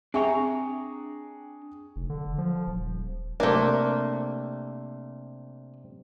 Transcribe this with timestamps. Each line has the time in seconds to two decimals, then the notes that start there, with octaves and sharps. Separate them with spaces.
0.14 C4 D4 G#4 E5 G5 A#5 C#6
1.96 F1
2.10 D3
2.38 F3
2.67 D#1
3.40 C3 A3 A#3 D4